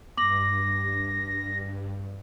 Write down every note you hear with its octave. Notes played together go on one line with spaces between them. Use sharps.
G2 D6 A#6 F#7